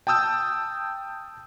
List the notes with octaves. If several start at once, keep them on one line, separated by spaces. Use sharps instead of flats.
G5 A5 D#6 E6 G6